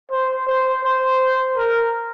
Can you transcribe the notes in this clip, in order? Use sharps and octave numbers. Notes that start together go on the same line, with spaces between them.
C5
C5
C5
A#4